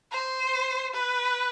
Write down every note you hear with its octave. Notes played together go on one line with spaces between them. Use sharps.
C5
B4